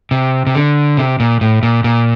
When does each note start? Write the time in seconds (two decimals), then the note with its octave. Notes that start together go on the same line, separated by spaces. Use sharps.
0.11 C3
0.47 C3
0.54 D3
0.97 C3
1.20 A#2
1.41 A2
1.63 A#2
1.84 A#2